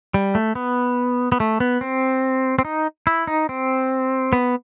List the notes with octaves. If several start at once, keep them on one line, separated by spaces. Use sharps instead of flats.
G3
A3
B3
B3
A3
B3
C4
C4
D#4
E4
D#4
C4
B3